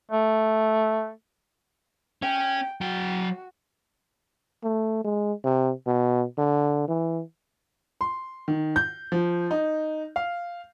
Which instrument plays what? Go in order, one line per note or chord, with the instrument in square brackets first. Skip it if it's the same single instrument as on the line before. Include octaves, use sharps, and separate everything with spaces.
[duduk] A3
[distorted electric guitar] C#4 [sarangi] G5
[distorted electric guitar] F#3 G5 [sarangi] F#4
[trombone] A3
G#3
C3
B2
D3
E3
[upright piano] C6
D#3
G6
F3
D#4
F5